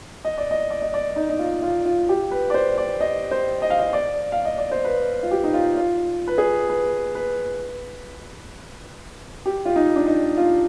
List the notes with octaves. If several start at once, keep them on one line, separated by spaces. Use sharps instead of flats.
D#5
D5
D#5
D5
D#5
D5
D#4
D#4
F4
F4
F4
G4
B4
D5
C5
D5
D#5
C5
D#5
F5
D#5
D5
F5
D#5
D5
C5
B4
F4
G4
D#4
F4
F4
B4
G#4
B4
B4
G4
F4
D#4
D4
D#4
F4